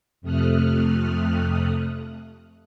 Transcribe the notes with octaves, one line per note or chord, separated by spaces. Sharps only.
F2 C3 A3 D#6 F6 F#6